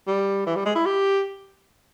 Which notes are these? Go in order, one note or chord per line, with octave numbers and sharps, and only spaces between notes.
G3
E3
G3
G#3
E4
G4